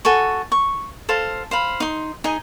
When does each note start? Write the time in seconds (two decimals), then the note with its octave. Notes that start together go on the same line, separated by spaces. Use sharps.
0.05 F#4 A4 G#5 C#6
0.52 C#6
1.09 A4 C5 F5
1.51 C5 F5 B5
1.80 D#4 C6
2.24 D#4 G#4 D#5 G#5